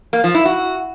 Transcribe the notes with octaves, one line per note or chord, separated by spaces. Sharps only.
A#3
F3
E4
F#4